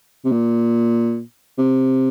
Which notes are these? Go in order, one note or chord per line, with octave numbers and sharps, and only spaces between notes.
C3
A#2
C3